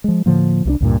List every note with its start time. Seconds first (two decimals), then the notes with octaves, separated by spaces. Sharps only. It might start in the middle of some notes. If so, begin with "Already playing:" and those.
0.04 F3 G#3
0.26 A2 D3 F3 A#3
0.65 C2 F3 D4
0.81 C#2 G2 A#2